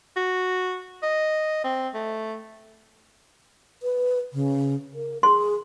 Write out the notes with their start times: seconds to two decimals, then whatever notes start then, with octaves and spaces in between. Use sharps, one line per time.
0.17 F#4
1.03 D#5
1.64 C4
1.94 A3
3.83 B4
4.33 C#3
4.94 A#4
5.23 G#4 C6